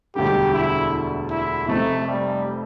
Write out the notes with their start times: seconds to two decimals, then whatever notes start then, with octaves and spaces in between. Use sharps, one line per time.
0.15 E1 D2 D3 G3 G4
0.53 E4
1.31 E4
1.68 F1 F2 C3 A3
2.07 G3